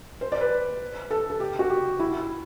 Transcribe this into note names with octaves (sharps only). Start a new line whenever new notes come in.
C5
D5
B4
A4
A4
G4
F#4
G4
E4